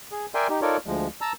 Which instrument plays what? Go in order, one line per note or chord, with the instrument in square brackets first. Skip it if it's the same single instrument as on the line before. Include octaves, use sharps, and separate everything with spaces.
[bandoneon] G#4
A#4 D5 E5 G5 G#5 C6
D#4 G4
D#4 F4 A4 A#4 C#5 D5
D2 F3 G#3
A5 A#5 E6